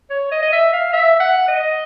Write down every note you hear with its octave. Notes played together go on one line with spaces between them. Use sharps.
C#5
D#5
D#5
E5
F5
E5
F#5
D#5